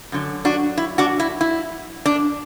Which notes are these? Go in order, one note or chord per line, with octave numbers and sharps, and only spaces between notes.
F#2 D3 F#3
D4 F#4
E4
D4 F#4
E4
E4
D4